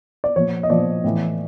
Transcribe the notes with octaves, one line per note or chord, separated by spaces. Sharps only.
D5
A#2 F3 C#5
D#5
A#2 F3 D5
A2 E3